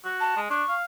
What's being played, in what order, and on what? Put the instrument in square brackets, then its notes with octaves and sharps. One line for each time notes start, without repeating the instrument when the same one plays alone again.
[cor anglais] F#4
[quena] A5
[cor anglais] G#3
[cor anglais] D4 [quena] C#6
[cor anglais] F5